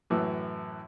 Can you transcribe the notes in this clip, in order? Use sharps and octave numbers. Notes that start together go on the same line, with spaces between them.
F#2 A2 E3